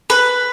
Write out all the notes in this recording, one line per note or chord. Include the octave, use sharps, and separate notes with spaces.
B4